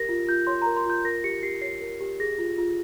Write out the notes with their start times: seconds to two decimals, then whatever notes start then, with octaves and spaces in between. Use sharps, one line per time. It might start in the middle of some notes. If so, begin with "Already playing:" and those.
Already playing: G4 A#4 A#6
0.09 F4
0.28 F4 G6
0.47 C#5 C6
0.62 A#4 A#5
0.77 C6
0.86 F4 G6
1.04 A#4 A#6
1.24 G4 C#7
1.43 G4 C7
1.62 C#5 C7
1.81 A#4
2.01 G4
2.20 G#4 A#6
2.38 F4
2.58 F4